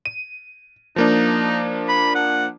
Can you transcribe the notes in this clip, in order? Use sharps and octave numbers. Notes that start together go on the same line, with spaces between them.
D#7
F3 A#3 D4 D#4
B5
F#5